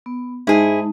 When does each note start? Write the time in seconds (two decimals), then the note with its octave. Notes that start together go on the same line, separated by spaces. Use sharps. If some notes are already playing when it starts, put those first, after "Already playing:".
0.06 B3
0.47 G#2 G#3 D#4 E4 G#4 A5